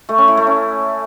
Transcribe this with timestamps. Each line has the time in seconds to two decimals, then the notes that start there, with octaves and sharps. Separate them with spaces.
0.09 A3
0.18 C#4
0.28 E4
0.37 A3
0.47 C#4